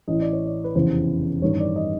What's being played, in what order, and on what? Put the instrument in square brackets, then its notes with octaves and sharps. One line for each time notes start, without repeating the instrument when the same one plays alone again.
[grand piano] A1 A2 E3 D#5
D5
C#5
D5
B4
F1 E2 C#3 E3 C5
A1 G2 D#3 C#5
D5
D#5